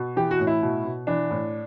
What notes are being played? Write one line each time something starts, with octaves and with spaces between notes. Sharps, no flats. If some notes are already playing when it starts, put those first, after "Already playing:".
Already playing: B2
E3 G4
F#4
A2
E4
B2
B2
E3 D4
A2